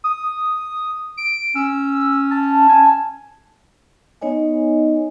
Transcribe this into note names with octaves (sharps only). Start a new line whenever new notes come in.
D#6
D7
C#4 E6
A5
G#5
B3 D#4 C#5 D#5 G#5